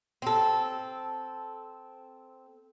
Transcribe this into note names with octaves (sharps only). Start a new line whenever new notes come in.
C4 A4